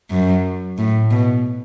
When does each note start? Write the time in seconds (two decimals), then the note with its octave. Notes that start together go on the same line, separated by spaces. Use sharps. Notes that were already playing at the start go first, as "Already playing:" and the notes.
0.11 F#2
0.78 A2
1.11 B2